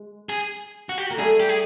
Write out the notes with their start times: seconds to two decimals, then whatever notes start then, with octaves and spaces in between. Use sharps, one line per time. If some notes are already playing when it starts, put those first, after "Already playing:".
Already playing: G#3
0.29 G#4
0.89 F#4
0.98 G4
1.07 F#4
1.10 A#3
1.18 G3 A3 G#4
1.40 G4
1.49 G#4